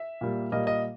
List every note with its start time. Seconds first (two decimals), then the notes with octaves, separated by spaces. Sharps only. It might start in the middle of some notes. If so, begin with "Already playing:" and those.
Already playing: E5
0.21 A#2 G3 A#3
0.52 A#2 G3 A#3 D#5
0.67 D#5